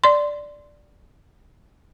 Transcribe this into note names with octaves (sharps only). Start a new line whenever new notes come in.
D5 C6